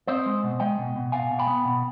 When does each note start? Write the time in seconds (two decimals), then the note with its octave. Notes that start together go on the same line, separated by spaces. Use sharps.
0.07 C4 C5 D#5
0.26 G#3
0.44 B2
0.60 G#3 D#5 G5
0.79 B2
0.96 B2
1.12 B2 F5 G#5
1.31 B2
1.39 G5 B5
1.47 B3
1.65 B2